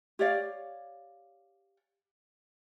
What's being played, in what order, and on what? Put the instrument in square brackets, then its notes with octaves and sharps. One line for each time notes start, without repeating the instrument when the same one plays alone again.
[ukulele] G4 C#5 D5 F5